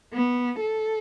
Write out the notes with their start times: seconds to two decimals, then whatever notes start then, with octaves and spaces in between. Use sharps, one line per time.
0.14 B3
0.61 A4